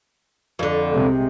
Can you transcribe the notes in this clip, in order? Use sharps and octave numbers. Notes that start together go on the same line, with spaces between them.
F2 D3
C2 C3 G#3